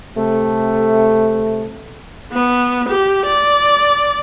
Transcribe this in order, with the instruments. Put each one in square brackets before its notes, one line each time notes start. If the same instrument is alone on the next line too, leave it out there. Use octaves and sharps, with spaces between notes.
[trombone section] C3 A3
[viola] B3
G4
D5